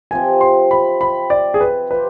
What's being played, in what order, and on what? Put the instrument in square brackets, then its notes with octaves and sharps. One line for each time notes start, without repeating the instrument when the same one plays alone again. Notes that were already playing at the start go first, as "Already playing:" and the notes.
[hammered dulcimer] C3 F3 C4 [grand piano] G#5
[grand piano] C6
B5
B5
D5
G#4
B4
[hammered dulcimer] F3 C4 G4 [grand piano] B4